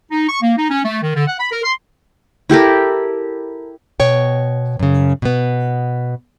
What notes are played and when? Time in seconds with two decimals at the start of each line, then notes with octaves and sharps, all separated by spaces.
0.11 D#4
0.28 C#6
0.41 A#3
0.57 D#4
0.70 C#4
0.85 A3
1.02 D#3
1.14 D3
1.27 F#5
1.40 B5
1.52 A#4
1.63 C6
2.49 E4 G4 A4 A#4
4.00 B2 C#5 G5
4.79 F#2 C#3
5.22 B2 B3